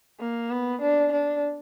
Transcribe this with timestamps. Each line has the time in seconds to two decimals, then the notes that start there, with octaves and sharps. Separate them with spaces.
0.20 A#3
0.50 B3
0.82 D4
1.12 D4